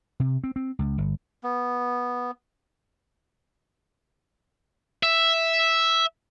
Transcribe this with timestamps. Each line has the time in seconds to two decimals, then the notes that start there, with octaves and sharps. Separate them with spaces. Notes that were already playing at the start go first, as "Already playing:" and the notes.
0.20 C3
0.44 C4
0.56 C4
0.79 C#2
0.98 G1
1.43 B3
5.03 E5